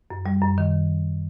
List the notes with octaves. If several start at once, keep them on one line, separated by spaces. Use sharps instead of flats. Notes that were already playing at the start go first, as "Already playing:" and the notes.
F#2
G3
F#2
D#3